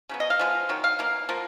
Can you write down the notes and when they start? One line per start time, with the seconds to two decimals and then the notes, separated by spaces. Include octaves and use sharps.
0.09 C#3 F#3 B3
0.20 D#5
0.30 F5
0.39 F3 G#3 B3
0.69 D#3 F#3
0.84 F5
0.99 B2 A#3
1.29 F3 A#3